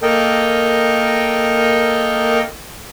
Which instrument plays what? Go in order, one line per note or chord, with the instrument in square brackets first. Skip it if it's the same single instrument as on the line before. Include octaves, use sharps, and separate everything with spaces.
[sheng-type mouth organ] A#3 A4 A#4 D#5 G5